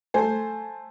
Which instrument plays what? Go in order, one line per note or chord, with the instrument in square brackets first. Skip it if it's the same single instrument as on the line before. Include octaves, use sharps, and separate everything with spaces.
[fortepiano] A3 C5 G#5